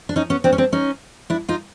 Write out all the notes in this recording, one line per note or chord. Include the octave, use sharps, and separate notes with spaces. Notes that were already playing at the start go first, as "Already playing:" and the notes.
D4
C#4 D#4
B3 C#4
C4 D4
C#4
C4 D4
C#4 D#4
D4 E4
D#4 F4